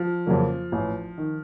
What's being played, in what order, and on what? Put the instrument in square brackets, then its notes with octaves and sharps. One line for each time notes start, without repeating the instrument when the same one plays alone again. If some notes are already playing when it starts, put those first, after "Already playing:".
Already playing: [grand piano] F3
[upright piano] F2 C#3 F#3 A#3
A1
D#3